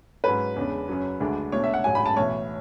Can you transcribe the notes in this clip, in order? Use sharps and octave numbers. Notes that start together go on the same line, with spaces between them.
G#2 F#3 C#4 B4
E2 C#3 G#3 D4
F#2 C#3 F#3 C#4
D2 D3 G#3 D4
B1 B2 A3 D4 C#5
E5
F#5
A1 G#2 F#3 C#4 G#5
B5
A5
B1 A2 E3 C#5